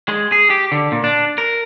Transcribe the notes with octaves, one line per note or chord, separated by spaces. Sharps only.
G#3
G#4
G4
D3
A#2
D4
A#4